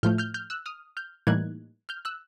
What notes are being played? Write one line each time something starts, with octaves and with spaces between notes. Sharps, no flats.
A2 F3 A3 F6 G6
F6 G6
F6 G6
E6 F#6
D#6 F6
F6 G6
A2 E3 G3 A#3 D#4 F#6 G#6
F6 G6
E6 F#6